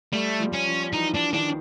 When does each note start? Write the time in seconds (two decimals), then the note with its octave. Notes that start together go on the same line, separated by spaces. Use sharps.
0.13 G3 A3
0.40 F3
0.53 C#4
0.67 F3
0.93 E3 D#4
1.14 D4
1.33 D#3 D4